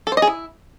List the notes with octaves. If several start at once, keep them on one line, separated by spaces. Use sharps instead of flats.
A4
C5
D#5
G#4
E4